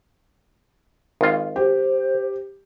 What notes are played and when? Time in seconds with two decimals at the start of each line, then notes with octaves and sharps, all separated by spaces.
1.21 G#1 F4
1.56 G4 C5